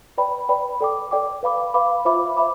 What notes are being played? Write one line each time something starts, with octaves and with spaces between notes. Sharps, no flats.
B4 D5 G5 B5
B4 D5 G5 B5
A4 D5 G5 D6
A4 D5 G5 D6
B4 F5 B5 D6
B4 F5 B5 D6
F4 C5 E5 B5 D6
C5 E5 B5 D6